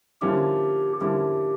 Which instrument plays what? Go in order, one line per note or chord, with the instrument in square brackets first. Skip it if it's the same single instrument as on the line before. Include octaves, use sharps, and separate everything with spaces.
[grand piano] D3 F3 A#3 C#4 E4 [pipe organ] G4
[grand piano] D3 F3 A#3 C#4 E4 [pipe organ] G4